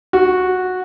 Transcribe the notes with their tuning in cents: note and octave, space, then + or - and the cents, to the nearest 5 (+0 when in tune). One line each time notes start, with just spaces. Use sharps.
F#4 -10